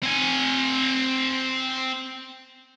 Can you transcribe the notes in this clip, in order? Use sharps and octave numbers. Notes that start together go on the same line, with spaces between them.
C4 G#5